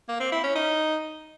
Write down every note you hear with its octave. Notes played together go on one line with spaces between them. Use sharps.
A#3
C4
E4
C#4
D#4